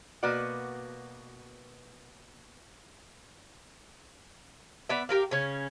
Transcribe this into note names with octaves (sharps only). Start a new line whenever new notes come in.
B2 A#3 F#4 B4 D5 F#5
B3 D5 E5
G4 A#4 F5
C#3 C#4